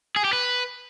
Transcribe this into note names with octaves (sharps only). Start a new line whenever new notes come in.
G#4
G4
B4